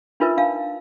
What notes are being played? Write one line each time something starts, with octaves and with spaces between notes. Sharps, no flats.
D4 D#4 F4 A#4 B4 E5
D4 F5 A5